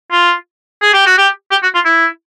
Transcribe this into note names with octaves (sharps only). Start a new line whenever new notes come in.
F4
G#4
G4
F#4
G4
G4
F#4
F4
E4